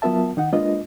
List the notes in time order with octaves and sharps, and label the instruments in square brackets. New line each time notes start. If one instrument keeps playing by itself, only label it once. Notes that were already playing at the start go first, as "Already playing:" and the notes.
[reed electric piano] F#3 B3 F4 A#4 E5 A5
D#3 D#4 F#5
G#3 A#3 D4 F4 B4 D#5